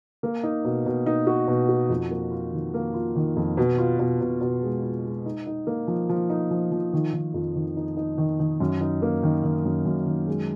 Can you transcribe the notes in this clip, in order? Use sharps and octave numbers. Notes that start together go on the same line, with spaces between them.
A#3
D#4
B2
B2
D#4
F#4
B2
F#4
F2
A#3
F4
D#3
A#3
F4
D#3
F2
B2
F4
B2
B2
B2
G#3
F4
G#3
D#4
D#4
A#3
F3
F3
D#4
F3
F3
D#3
D#3
F2
D#3
D#4
D#4
D#3
D#3
F#2
D#4
A#3
D#3
D#3
F#2
F#2
D#3
G#3